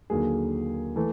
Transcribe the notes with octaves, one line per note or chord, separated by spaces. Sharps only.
D#2 D3 F#3 A#3 G#4
E3 A3